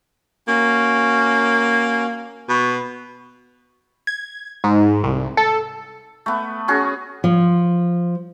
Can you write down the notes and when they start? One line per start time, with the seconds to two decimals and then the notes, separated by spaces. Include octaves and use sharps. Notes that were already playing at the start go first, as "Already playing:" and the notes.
0.48 A#3 C#4 F#4
2.49 B2
4.07 G#6
4.64 G#2
5.04 C2
5.37 A4
6.26 A3 B3
6.68 C#4 F#4 G#4
7.24 F3